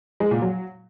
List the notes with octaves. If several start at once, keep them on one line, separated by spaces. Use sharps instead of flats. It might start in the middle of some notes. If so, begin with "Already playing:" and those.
G#3
A#2
F#3